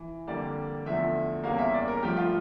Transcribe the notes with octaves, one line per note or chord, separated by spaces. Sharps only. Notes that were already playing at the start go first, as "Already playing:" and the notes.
Already playing: E3
F2 D3 G3 A#3 D5
E2 D3 F3 A3 E5
E2 C#3 G3 A#3 F5
E5
D5
A#4
G2 F3 A3 G4
F4